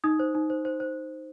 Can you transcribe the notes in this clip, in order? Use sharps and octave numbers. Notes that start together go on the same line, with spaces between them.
D#4 D#6
C5
D#4
C5
C5
C5